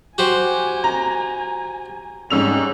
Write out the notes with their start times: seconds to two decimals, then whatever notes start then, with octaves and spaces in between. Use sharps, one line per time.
0.18 F#4 G4 C5 G#5
0.84 A#5
2.30 G#2 G3 C#4 E6 F7